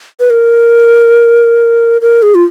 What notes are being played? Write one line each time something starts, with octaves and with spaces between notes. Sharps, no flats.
B4
A#4
A#4
G#4
F4